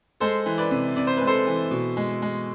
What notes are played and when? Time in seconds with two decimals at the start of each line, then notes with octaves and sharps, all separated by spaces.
0.20 G#3 A4 C5
0.46 E3
0.58 B4 D5
0.71 C3
0.96 C3 D5
1.07 C5
1.17 G#3 B4
1.27 A4 C5
1.47 E3
1.71 B2
1.97 G#3
2.22 G#3